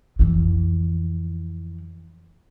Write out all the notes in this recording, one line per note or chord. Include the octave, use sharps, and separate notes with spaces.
F2 E3